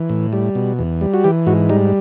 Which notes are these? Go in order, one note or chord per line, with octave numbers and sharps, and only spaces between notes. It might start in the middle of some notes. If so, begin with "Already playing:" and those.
Already playing: E3
A2
G3
B2
E2
G3
F#4
E3 G4
G#2 F#4
G3 D#4